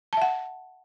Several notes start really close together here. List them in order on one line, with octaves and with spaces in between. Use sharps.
A5 E5 F#5